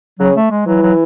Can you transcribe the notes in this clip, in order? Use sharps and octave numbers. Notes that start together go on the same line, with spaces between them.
C#3 F#3
A3
G#3
E3 F#3
F#3